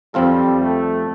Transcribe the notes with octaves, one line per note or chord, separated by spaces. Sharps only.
F2 F3 G3 C4 F4 A4
A3